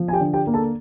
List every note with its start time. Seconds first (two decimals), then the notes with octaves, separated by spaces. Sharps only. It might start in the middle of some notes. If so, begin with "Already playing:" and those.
Already playing: F3
0.08 G#5
0.13 G4 G5
0.20 D3
0.34 G4 G5
0.47 A#3
0.54 A4 A5